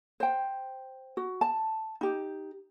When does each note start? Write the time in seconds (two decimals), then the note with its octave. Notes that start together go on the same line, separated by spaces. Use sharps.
0.20 C5 G5
1.17 F#4
1.41 A5
2.01 D#4 G4